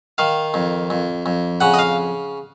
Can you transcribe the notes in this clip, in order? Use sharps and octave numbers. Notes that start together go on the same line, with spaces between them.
D#3 F5
F2
F2
F2
C#3 F#5
D#5
F5